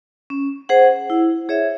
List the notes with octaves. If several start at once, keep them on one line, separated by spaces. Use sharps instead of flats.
C#4
G#4 C5 F#5
E4
G#4 C#5 E5